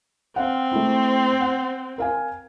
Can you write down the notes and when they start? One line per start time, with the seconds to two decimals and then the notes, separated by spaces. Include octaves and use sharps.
0.36 C4 F5 F#5
0.72 A3 E4
1.41 F#5
1.98 A#4 F5 G#5